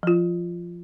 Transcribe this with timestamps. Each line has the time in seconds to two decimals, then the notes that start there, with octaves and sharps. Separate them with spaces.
0.03 F3 F4